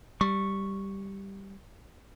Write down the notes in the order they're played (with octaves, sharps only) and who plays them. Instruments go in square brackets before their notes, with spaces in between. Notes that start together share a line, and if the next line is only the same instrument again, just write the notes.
[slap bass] G3 [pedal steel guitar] C#6